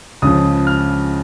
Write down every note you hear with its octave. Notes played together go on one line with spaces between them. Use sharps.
C#2 C#3 F3 D#6
F6